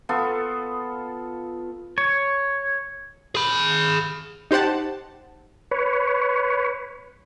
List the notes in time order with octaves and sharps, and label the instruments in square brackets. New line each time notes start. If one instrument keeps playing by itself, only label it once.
[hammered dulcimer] B3 F4 A4
[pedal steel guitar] C#5
[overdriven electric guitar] G#4 B5
[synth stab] D#4 G4 C5 F#5 A5
[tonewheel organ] B4 C#5